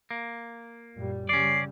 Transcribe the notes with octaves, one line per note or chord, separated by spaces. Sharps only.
A#3
F#2 A#2 G3
C#3 G3 C#4 D5 C7